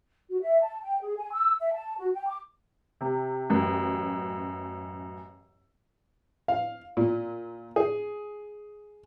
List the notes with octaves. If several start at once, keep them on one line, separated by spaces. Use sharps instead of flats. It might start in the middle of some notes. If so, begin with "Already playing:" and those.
F#4
E5
A5
G5
G#4
G#5
E6
E5
A5
F#4
G5
D6
C3
A1 F#2
F5
A#2
G#4